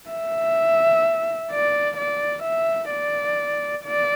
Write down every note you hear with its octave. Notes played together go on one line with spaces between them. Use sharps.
E5
D5
D5
E5
D5
D5